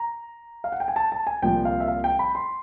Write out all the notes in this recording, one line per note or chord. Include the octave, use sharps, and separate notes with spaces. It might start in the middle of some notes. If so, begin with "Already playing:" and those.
Already playing: A#5
F5
F#5
G5
G#5
A5
A5
G#5
C2 A#2 F3 G5
F5
E5
F5
G5
B5
C6